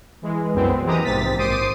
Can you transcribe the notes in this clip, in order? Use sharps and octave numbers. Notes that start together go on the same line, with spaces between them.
E3 G#3
C2 F#2 B3 C4
E3 G#3 G4 A#5 D#6
A#1 G#2 C3 A6 B6
G#1 C5 D6 D#6 C7 D#7